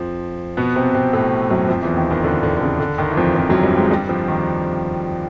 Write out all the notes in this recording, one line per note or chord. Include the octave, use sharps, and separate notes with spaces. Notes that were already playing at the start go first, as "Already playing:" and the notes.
Already playing: F2 F3
B2 B3
C3 C4
C3 C4
A2 A3
F#2 F#3
F2 F3
E2 E3
D#2 D#3
D#2 D#3
D3
D3
D3
C#3
D3
D#2 D#3
E3
F2 F3
F2 F3
F#2 F#3
G2 G3
G#2 G#3
G2 G3
F2 F3
D#2 D#3